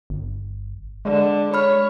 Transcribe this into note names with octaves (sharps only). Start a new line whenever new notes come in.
G1
D3 G#3
C#5 B5 F6